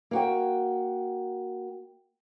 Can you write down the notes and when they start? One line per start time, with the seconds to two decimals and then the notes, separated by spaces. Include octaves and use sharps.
0.11 A#3 F#4 G5